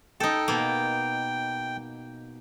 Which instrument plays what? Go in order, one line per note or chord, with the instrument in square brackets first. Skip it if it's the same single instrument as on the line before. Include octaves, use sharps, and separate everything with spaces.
[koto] D#4 A4 [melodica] G5
[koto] B2 A#3